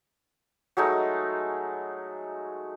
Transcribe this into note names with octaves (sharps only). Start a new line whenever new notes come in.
F#3 G#3 A3 D#4